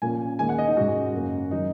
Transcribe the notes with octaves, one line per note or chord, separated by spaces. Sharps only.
A#1 A#2 A#3 C#4 G#5
D#2 D#3 G#3 G#5
F#5
D#5
D#4
G#2 G#3 C#4 F#4
F#2 C#3 A#3 C#4
D#3 F#3 D#4